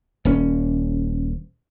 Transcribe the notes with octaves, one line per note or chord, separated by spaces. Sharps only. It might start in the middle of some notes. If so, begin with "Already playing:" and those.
D#1 C#4